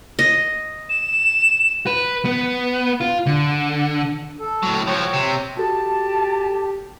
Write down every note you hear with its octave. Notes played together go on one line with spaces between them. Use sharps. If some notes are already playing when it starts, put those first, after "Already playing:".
D#5
E7
B4
B3
F4
D3
A4
A2 F#3
F3 F#4 C#5 G5
C3
F#4 G4 A4 A5